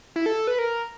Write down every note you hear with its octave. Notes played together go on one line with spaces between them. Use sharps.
E4
A4
B4
A#4